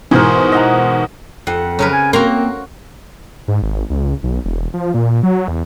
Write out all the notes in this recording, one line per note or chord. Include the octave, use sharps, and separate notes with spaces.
G#2 B2 E3 A#4 C5 G#5
D#5 F#5 A#5
F2 F#5
C#3 F#3 A#4 B4
G#5
A#3 C4 F#4 A#5 C6
G#2
G#1
C#2
B1
E1
F3
A#2
F#3
E2